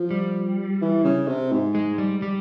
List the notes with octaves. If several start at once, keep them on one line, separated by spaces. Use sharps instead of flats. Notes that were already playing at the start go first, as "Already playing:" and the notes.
Already playing: F3
G3
E3
C#3
C3
G#2
G#3
G3
G3